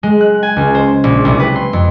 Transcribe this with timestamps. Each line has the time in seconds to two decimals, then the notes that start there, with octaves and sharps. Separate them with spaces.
0.03 G#3
0.21 F#6
0.43 G#5
0.56 C#2
0.75 C5
1.04 A#1
1.25 C2
1.39 B4
1.55 C6
1.73 F2